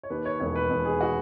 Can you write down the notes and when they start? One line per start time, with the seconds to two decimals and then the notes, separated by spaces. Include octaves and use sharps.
0.03 C#5
0.10 D#2 B4
0.25 C#5
0.39 E1 C#5
0.56 B4
0.70 E1
0.85 G#4
1.01 F#4